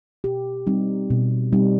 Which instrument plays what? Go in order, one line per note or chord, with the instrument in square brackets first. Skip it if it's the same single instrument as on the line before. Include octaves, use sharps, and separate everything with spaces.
[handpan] B2 G4
G3 C4 D#4
B2
G3 C4 D#4